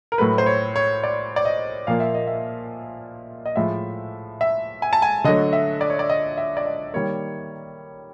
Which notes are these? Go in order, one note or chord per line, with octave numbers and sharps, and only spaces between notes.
A#4
A2 F#3 A3 B4
C5
C#5
C#5
D5
D5
D#5
A#2 F3 A#3 F5
E5
D#5
E5
D#5
A2 F3 G#3 E5
E5
G#5
A5
G#5
D3 F#3 A3 D#5
E5
D5
C#5
D5
D#5
E5
D5
D#5
D#3 G3 A#3 C#5